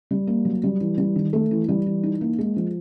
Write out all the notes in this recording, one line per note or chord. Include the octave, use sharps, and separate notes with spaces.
G3
A#3
F#3
G3
E3
G3
D#3
A3
E3
G3
E3
D#4
A#3
G#3
F3